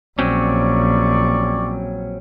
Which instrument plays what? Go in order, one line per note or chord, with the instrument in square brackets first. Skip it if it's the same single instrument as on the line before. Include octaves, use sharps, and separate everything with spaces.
[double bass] A#1 [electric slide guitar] F#3 C4 C#4 [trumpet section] D5 C#6